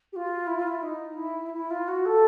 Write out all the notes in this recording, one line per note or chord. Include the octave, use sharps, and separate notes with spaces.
G4
F4
E4
F4
E4
D#4
E4
E4
F4
F#4
A4